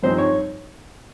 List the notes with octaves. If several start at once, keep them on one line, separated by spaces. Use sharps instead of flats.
G2 F3 C4 D#4 C5
C#5